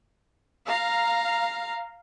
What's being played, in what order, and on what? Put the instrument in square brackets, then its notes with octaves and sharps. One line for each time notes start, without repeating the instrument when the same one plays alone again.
[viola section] F5 A#5